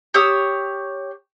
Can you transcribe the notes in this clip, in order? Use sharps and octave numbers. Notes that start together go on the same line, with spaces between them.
G4 C#5 D#6 E6